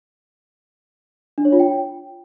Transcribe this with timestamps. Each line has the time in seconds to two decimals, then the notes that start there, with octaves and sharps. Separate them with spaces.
1.38 D4
1.45 C#5
1.52 F4
1.60 G5